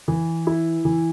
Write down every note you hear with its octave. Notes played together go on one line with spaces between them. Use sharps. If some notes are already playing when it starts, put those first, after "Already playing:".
E3
E4
E3